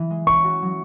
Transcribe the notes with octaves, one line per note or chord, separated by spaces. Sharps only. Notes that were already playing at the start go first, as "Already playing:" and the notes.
Already playing: E3 B3 E4
G#3
C#4 C#6
F#4
F#3